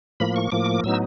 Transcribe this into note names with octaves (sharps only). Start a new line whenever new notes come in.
A2 F3 A#3 B5
C#6
A2 F3 A#3 D6
A2 F#3 B3 D#4 E6